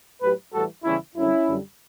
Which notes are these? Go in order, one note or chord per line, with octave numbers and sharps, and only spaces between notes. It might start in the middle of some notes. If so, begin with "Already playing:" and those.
A2 F#3 G4 B4
A2 E3 G3 F#4 A4
E2 C#3 E3 G3 C#4 E4
F#2 D3 G3 C#4 E4
F#2 D3 G3